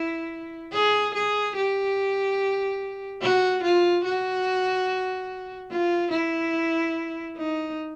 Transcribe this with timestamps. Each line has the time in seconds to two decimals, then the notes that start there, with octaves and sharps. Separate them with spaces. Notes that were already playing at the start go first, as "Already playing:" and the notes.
Already playing: E4
0.73 G#4
1.14 G#4
1.56 G4
3.22 F#4
3.63 F4
4.05 F#4
5.71 F4
6.11 E4
7.36 D#4